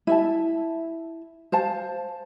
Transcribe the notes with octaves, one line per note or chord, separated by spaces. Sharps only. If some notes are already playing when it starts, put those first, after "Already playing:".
E4 E5 A5
C5 F5 A5